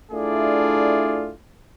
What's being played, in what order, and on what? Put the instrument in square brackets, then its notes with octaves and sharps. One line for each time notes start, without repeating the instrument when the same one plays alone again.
[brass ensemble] A3 D4 E4 F4 G#4 D5